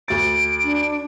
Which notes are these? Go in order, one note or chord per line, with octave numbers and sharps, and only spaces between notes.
D2 A6 D7
D4